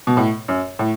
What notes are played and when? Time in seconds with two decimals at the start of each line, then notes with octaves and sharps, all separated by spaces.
0.07 B2
0.17 A2
0.48 F#2
0.79 A2